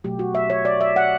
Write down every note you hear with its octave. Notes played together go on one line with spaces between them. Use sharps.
B2 F#3 A3 G4
F#4
E5
C#5
D5
E5
F#5